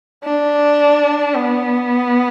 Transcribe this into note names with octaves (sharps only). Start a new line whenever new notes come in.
D4
B3